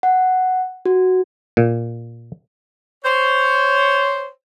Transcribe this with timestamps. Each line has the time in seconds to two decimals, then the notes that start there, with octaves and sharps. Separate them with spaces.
0.03 F#5
0.85 F#4
1.57 A#2
3.05 C5 C#5